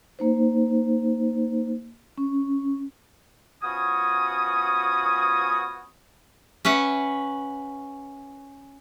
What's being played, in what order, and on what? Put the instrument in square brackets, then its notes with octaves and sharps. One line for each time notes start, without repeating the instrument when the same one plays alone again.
[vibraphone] A#3 D#4 C5
C#4
[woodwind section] F3 B3 C#4 F#4 G#5 D#6
[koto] C#4 B4 E5 F#5